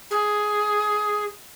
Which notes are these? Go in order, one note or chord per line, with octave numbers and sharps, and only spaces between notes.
G#4